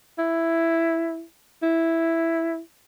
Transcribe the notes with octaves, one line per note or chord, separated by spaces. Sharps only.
E4
E4